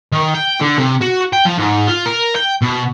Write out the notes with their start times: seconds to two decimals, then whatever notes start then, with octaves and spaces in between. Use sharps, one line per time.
0.12 D#3
0.34 G5
0.60 D3
0.77 C3
1.01 F#4
1.33 G5
1.45 F3
1.58 G#2
1.87 F4
2.06 A#4
2.36 G5
2.62 B2